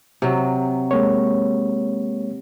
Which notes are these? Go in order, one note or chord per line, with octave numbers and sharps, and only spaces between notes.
C3 F#3
G#3 A#3 C#5